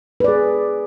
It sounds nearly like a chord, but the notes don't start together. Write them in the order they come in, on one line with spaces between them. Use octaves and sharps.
B4 D5 G#4